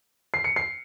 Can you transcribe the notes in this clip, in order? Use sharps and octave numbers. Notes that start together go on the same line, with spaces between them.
C7
C#7
C7